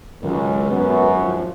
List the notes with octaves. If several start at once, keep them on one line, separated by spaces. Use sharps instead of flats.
C#2 G#2 D#3 F#3 A#4
F#2 B3
F3